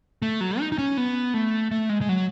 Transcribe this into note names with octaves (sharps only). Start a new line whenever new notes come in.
A3
F#3
D#4
D#4
C#4
B3
A3
A3
G#3
G#3
F#3